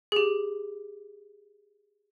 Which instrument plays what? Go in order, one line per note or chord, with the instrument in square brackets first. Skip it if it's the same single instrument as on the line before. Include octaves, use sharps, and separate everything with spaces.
[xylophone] G4 G#4